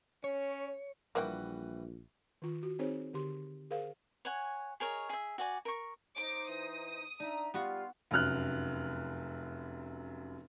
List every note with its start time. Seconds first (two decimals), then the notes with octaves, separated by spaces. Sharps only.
0.24 C#4 C#5
1.15 A#1 E3 G3 A#3 F#4 D#5 G5
2.42 D#3 F4
2.63 F#4
2.79 C4 D#4 G#4 C5 C#5
3.14 D3 G4 C6
3.71 G#4 A#4 C5 F5
4.25 C#5 F#5 G#5
4.80 G#4 A#4 C#5 D#5
5.10 G#4 E5
5.38 F#4 D5 G#5
5.65 A#4 C#6
6.17 D#4 C5 D6
6.49 E3 D#6
7.20 D4 D#4 E5 A#5
7.54 G3 B3 F4 F#4
8.11 F1 F#2 F6 F#6